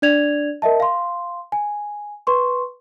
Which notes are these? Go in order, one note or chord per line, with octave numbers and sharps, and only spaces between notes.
D4 D5 G#6 F7
A#4 D#5 E5 A5
F5 C6
G#5
B4 C6 C#6